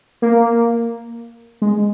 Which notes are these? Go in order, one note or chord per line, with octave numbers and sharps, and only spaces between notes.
A#3
G#3